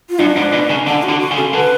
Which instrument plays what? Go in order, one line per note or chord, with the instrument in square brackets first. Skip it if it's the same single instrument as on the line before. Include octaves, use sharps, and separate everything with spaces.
[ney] F4
[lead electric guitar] F#2 [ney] D4
[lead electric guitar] G#2
B2
C#3
[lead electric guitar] D3 [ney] D4
[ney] F#4
[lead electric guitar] D3
[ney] F#4
[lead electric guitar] C#3
[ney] A4
[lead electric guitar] D3 [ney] B4